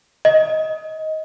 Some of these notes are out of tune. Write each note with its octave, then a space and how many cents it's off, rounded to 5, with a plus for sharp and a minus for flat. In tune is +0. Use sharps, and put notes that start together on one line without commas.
D#5 +15